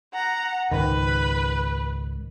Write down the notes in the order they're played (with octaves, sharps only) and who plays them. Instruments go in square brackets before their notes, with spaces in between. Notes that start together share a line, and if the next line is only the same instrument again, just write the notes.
[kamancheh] F#5 A#5
[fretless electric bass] C#2 G#2 D#3 [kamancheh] B4